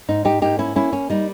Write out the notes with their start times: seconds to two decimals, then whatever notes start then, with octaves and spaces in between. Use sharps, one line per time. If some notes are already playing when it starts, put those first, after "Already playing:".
0.09 G#2 D#4
0.25 D#4 G4
0.42 A#3 D#4 G4
0.59 C#4 E4
0.76 A#3 C#4 E4
0.93 C#4
1.10 G3 D#4